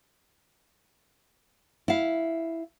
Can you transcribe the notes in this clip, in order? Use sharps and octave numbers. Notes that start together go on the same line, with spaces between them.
E4 F5